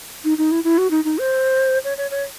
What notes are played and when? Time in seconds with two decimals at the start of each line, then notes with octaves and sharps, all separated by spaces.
0.24 D#4
0.38 D#4
0.51 E4
0.64 E4
0.78 F#4
0.91 D#4
1.04 D#4
1.18 C5
1.84 C#5
1.97 C#5
2.11 C#5